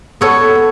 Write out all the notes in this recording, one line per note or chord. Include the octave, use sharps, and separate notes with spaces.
B3 A4 C#5